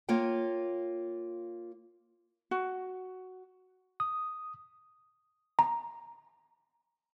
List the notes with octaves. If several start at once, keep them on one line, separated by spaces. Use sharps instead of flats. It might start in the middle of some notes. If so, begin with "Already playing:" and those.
A#3 F4 C#5 G5
F#4
D#6
A#5